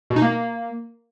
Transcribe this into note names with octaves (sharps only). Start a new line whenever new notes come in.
B2
D#4
A#3